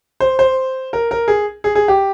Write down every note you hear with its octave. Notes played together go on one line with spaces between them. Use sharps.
C5
C5
A#4
A#4
G#4
G#4
G#4
G4